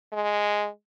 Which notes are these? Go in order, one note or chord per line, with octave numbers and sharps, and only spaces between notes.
G#3